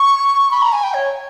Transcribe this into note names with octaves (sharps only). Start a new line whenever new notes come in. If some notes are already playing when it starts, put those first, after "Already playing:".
Already playing: C#6
B5
A#5
G#5
G5
C#5